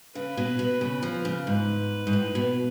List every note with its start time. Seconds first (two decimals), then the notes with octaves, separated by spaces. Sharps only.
0.15 C#3 B4
0.37 B2
0.59 B2
0.81 C#3
1.03 F3
1.25 C#3
1.47 G#2 B4
2.07 G#2
2.13 A2
2.35 B2